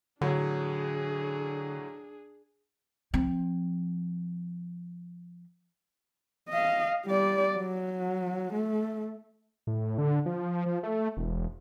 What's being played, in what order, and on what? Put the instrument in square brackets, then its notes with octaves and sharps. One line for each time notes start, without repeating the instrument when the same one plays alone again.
[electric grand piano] A2 F#3 [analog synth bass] D3 [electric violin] D4 G#4
[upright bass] F3 C4
[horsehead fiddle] D#5 F5
G3 D5
F#3
A3
[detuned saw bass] A2
D3
F3
F3
A3
E1